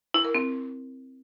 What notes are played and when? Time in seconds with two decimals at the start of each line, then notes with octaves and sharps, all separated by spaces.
0.14 E4
0.24 A#4
0.35 C4